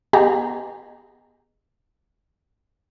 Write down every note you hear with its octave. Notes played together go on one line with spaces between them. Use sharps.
B3 G4 G#4 D#5 A#5